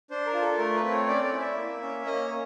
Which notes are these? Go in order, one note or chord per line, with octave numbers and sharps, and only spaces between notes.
D4 C5
A#4
F4
A4
A3 A#4
B4
C4
C#5
C#4 D5
D5
E4
E5
A#3
C#4
A#3 D#5
C#4